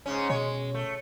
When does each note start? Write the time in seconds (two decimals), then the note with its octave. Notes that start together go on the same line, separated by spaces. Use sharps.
0.06 G#2 C#3 C#4
0.30 B2 G#3 C#5
0.74 A3